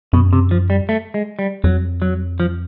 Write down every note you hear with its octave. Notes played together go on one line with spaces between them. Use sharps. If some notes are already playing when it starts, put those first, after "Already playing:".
F#2 B2
C3
F3
G3
A3
G#3
G3
F2 F#3
F#3
F3